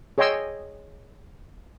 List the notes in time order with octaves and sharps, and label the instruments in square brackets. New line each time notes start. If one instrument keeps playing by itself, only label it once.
[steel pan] G#4 C#5 D#5 G5 C6 E6